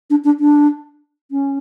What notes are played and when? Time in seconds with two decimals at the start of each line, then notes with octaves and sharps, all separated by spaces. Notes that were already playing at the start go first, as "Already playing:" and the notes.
0.10 D4
0.24 D4
0.40 D4
1.31 C#4